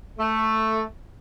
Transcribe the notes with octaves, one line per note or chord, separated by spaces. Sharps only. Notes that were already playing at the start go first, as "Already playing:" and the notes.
A3